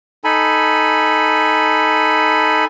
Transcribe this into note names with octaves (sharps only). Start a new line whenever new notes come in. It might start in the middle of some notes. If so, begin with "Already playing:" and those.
D#4 A4 G#5 B5